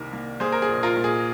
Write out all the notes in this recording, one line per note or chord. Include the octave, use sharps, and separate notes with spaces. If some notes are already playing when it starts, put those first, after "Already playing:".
Already playing: C2 C3 D#3 A#3 A#4
A#3
A#3 G#4 C5
A#4
G#4
A#1
F4 A#4
A#2
G#4